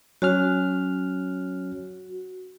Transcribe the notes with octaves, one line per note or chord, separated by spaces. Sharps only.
F#3 C#4 F#4 F6